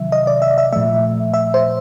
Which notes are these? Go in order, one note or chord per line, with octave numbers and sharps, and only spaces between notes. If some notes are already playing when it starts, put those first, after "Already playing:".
Already playing: C3 D#3 F#3 E5
D#5
D5
E5
E5
A#2 F3 A3 E5
E5
C5